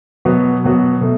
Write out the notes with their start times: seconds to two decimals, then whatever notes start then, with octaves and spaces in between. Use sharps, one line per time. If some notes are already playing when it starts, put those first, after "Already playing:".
0.25 B2 F#3 B3 F#4
0.64 B2 F#3 B3 F#4
1.01 B2 A3